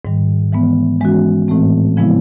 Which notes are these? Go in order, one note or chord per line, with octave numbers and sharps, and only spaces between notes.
G#2 D#3 G3
E3 G#3 B3
E3 G#3 C#4 F#4
A2 E3 A3 C4
C#3 F3 G#3 B3 E4